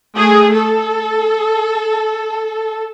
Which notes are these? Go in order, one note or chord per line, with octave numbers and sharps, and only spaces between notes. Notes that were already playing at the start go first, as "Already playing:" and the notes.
A3 G#4
A4